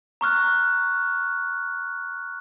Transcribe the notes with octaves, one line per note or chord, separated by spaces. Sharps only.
A#5 C#6 F6 F#6